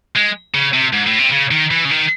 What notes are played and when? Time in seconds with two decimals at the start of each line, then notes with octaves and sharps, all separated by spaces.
0.16 G#3
0.54 C#3
0.73 C3
0.93 G#2
1.06 A2
1.19 C3
1.32 C#3
1.51 D#3
1.71 E3
1.85 C#3
1.91 D#3